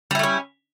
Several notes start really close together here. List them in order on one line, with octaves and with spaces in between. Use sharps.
G3 E4 A3 C#4